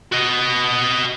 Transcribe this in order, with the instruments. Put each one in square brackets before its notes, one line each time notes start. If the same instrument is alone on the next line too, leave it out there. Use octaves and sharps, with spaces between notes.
[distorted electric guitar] F#4 D#5